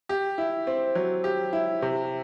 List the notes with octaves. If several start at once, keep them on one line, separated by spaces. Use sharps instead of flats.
G4
E4
C4
F#3
G4
E4
C3